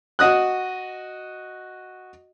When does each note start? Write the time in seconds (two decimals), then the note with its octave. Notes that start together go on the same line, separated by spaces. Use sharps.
0.19 F#4 D#5 D#6 F#6